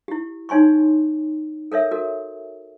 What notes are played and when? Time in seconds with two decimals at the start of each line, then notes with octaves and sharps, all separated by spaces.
0.08 E4 G4
0.49 D#4 C#5 G#5 C6 C#6
1.72 A4 A#4 C#5 E5
1.91 F#4 A4 A#4